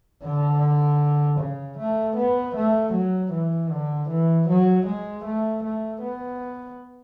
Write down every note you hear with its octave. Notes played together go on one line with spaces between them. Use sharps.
D3
C#3
A3
B3
A3
F#3
E3
D3
E3
F#3
G#3
A3
A3
B3